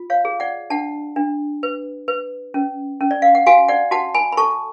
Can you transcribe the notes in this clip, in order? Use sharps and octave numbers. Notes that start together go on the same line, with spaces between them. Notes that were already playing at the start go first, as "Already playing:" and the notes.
Already playing: F4
C#5 F5
G#4
D5 F#5
D4 F#5 A5
D4
B4
B4
C#4
C#4
D5
F5
F#5
F#4 F5 G#5
D5 F#5
F#4 F#5 A5
G#5 B5
B5
A4 A5 C#6